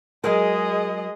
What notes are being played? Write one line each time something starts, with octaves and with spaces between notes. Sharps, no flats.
F#3 G#3 G#4 A#4 D#5